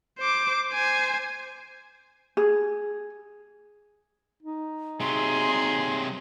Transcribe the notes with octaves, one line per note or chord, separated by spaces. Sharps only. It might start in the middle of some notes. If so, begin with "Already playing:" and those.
C5 D6
C5 G#5
G#4
D#4
C3 F#3 G#4 C6